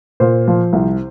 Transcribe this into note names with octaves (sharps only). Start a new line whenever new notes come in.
A#2 C5
F3
C2